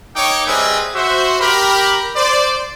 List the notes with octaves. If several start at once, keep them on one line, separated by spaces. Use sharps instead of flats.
A#3 D#4 C#5 G5 D6
G3 C4 G#4 B4 D#5 E5
F#4 C5 E5
G4 A#4 B5
C5 D5